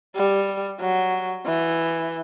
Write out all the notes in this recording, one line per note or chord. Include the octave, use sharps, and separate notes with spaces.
G3
F#3
E3